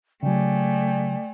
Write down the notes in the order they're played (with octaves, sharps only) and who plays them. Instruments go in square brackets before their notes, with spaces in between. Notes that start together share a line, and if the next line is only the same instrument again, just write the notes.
[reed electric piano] C#3 F#3 [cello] A3 [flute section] D5 G5 G#5